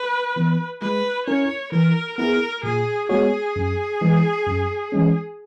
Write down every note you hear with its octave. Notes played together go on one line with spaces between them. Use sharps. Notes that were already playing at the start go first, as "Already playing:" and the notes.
Already playing: B4
E3 B3
G#3 B4
C#4 E4 A#4 C#5
E3 A#4
B3 E4 G#4 A#4
A#2 G#4
G#3 B3 F#4 G#4 C#5
F#2
E3 G#3
F#2
E3 G#3 C#4